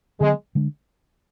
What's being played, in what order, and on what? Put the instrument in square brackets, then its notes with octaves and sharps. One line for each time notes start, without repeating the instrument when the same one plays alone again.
[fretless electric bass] D3 F#3 B3 [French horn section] G#3
[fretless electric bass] D3 G#3 D4